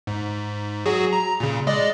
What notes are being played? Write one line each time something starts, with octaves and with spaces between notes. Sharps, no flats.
G#2
F#3 F#4 G#4
A#5
A#2 C#3
G#3 D5 D#5